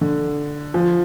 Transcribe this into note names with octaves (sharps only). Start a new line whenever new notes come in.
D3
F3